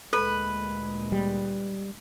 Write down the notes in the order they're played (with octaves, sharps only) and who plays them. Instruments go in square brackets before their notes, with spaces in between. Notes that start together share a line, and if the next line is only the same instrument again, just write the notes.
[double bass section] D2 A#2 G#3 [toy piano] A4 [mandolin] B4
[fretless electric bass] G3